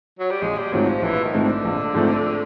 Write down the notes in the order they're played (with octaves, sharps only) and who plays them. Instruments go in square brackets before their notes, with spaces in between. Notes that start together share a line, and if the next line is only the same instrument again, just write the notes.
[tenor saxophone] F#3
G3
[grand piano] A#1 [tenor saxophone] G#3
[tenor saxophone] G3
[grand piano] G#2 F3 A3 C4 [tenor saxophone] F#3
[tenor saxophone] F3
[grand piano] A#1 [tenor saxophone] E3
[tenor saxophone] D#3
[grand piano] G#2 F3 A3 C4
[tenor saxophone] D3
[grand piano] A#1
G#2 F3 A3 C4